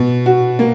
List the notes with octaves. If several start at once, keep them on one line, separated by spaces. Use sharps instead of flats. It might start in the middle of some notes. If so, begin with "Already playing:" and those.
Already playing: B2
F#4
A#3